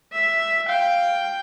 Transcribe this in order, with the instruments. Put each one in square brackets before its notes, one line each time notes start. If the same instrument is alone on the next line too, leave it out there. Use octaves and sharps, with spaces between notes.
[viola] E5
[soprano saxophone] F5 [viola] G5